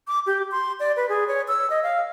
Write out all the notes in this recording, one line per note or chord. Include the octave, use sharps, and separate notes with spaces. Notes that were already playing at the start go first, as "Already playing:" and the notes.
D6
G4
C6
D5
B4
G#4
C#5
E6
D#5
F5